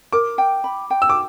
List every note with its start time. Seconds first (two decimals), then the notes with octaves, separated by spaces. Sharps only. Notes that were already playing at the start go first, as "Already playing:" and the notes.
0.13 A#4 D6
0.38 G5
0.64 B5
0.90 G5
1.02 E6
1.10 D6